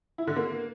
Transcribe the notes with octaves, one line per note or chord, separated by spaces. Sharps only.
E4
D3
A#3